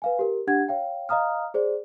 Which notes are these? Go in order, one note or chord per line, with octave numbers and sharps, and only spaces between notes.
B4 F5 G#5
G4 A#4
D4 G4 F#5 G#6
C#5 F5 G5
D#5 F5 A#5 D#6 F6
G#4 C5 D5